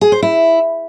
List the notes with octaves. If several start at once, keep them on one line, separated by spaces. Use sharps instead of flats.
G#4
C5
E4